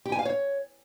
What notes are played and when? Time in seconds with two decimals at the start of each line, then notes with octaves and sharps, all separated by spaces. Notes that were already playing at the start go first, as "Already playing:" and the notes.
0.06 G4
0.12 G#5
0.19 F5
0.25 C#5